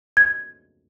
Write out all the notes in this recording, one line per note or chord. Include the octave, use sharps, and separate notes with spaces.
G#6